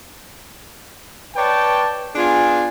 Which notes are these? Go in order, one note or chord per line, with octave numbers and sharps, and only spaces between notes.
B4 C#5 D5 G5 A5
B3 D4 F4 G#4 G#5